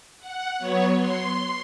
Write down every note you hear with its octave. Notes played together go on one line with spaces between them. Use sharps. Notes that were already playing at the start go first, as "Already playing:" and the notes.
F#5
F#3 B3 C#5
C6